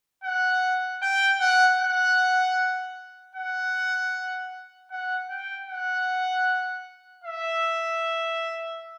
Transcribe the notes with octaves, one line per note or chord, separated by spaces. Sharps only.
F#5
G5
F#5
F#5
F#5
F#5
G5
F#5
E5